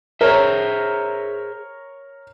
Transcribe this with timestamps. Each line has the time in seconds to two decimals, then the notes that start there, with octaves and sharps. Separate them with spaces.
0.21 G#4 A#4 C5 C#5 E5